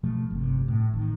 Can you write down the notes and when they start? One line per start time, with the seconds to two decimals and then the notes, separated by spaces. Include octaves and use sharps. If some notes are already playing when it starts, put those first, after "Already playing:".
0.03 B2 F3 A3
0.30 G1 C3
0.68 A2
0.94 A1 D#3